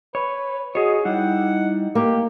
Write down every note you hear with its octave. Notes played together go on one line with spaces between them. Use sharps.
B4 C#5
F#4 G#4 C#5 D#5
G3 D#4 E4 F#5
A#3 G4